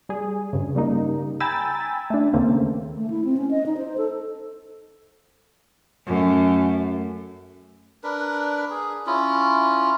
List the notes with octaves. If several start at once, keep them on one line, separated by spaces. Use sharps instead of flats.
G3 G#4
G2 C#3
C#3 G3 A#3 D#4
G5 G#5 A#5 B5 E6 A6
A3 D4
D#2 C#3 A3 A#3 C4
A3
E4
C4
C#4
D#5
D#4
C5
A4
F#2 A3
D4 A#4 B4
G#4
C#4 E4 F4